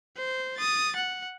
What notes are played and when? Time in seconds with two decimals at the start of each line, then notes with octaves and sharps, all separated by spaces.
0.17 C5
0.57 D#6 A6
0.96 F#5